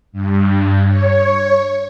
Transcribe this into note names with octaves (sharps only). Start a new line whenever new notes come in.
G2
C#5